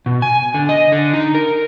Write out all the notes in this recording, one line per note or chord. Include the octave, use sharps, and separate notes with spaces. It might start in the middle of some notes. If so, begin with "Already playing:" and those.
B2
G#5
D3
D#5
D3
D#4
A#4